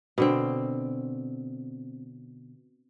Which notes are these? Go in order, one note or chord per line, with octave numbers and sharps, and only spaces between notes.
B2 D3 C4